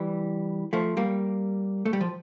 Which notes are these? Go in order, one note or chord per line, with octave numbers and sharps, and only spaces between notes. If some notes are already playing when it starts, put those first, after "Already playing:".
Already playing: E3 G3
F3 A3
G3 A#3
A3
G3
F3